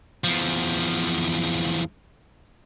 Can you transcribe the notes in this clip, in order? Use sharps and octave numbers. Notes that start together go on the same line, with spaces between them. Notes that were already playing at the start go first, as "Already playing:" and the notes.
E2 F3